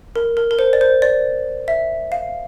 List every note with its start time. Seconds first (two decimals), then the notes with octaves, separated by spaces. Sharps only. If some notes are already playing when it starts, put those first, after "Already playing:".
0.16 A#4
0.37 A#4
0.51 A#4
0.59 C5
0.73 D5
0.81 C5
1.02 D5
1.68 E5
2.12 F5